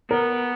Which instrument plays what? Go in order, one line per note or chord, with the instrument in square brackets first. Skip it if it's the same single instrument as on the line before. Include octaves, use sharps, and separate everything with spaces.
[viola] B3 [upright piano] A#4